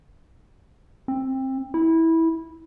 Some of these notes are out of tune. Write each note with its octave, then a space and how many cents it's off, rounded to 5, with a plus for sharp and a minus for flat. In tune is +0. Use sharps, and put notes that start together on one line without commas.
C4 +20
E4 -15